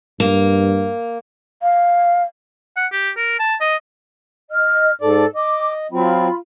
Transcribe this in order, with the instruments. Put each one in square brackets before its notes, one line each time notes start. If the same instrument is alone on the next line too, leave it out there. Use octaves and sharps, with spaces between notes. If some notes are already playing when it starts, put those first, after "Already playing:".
[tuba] G2 [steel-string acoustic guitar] A#3
[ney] F5
[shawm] F#5
G4
A#4
A5
D#5
[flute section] D#5 F6
[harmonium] G#2 D5 [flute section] A4
[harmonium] D#5 [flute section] D6
[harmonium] F#3 C4 [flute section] F4 B5